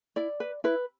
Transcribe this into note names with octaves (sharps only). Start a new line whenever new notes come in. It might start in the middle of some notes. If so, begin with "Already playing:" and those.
E4 D5
B4
E4 B4